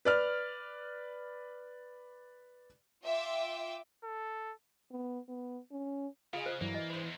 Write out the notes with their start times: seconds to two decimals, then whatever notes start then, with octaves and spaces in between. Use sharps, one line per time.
0.05 B4 D5 F6
3.03 F4 E5 G5 D6 E6
4.04 A4
4.91 B3
5.29 B3
5.72 C#4
6.33 C#3 F4 G#4 D#5 F5
6.46 C5
6.61 G2 E3 F#3 A#3 D5
6.74 D#5
6.90 G2 G#3 B4 C5
7.04 E2